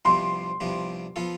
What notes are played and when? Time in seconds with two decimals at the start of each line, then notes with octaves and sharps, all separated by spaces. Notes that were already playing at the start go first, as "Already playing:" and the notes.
0.05 C2 C3 F3 B3 D4 C6
0.60 C2 C3 F3 B3 D4
1.16 F3 B3 F4 A4